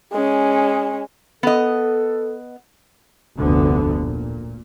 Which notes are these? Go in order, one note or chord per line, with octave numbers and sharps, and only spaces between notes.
G#3 C#4
B3 A4 D#5
F1 D2 G2 D3 B3
A#2